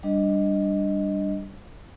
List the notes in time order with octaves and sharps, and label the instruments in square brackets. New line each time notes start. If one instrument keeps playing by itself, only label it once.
[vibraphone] G3 D4 D#5